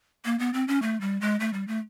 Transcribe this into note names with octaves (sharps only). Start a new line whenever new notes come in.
A#3
B3
C4
C#4
A3
G3
G#3
A3
G3
A3